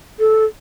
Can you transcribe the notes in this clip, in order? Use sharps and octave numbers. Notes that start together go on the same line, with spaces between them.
A4